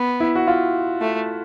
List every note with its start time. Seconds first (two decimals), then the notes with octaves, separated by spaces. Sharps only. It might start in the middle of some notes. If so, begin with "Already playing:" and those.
Already playing: B3
0.20 E4
0.35 F#4
0.47 F4
1.01 A3